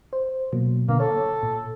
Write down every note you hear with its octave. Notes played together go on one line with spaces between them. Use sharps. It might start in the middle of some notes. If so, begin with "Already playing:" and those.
C5
B2 F#3 A#3
B2 D3 A#3 B3
A4 C#5
A#2